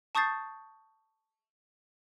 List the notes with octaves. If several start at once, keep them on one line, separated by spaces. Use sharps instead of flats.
A5 C#6 D#6 G6 A6 C7